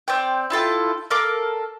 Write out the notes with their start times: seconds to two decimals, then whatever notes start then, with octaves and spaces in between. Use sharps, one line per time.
0.08 C4 D5 G5
0.50 E4 F4 A4 G5
1.10 A4 A#4 F5 D6